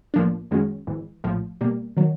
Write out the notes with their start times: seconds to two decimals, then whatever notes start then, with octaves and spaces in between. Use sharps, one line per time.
0.14 B1 A2 F3 A#3 D4
0.51 F#2 D#3 G#3 C#4 F#4
0.87 G#1 G#2 E3
1.24 A#1 A2 F3
1.61 B2 G3 A#3
1.97 D#3 F#3